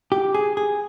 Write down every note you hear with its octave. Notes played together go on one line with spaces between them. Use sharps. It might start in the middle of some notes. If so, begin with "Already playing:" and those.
G4
G#4
G#4